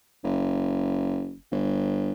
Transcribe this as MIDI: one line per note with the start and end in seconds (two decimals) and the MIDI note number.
0.24 1.35 30
1.51 2.13 31